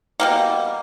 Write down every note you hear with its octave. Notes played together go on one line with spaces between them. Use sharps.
B2 G3 A#3